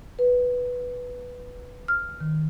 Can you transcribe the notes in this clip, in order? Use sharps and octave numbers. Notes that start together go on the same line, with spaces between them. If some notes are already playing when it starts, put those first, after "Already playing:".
B4
F6
D#3